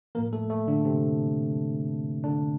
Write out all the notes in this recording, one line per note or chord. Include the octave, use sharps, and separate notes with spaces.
A2 F3 A#3 A#4
A3 A4
A3 A4
D3 D4
C3 C4
D3 D4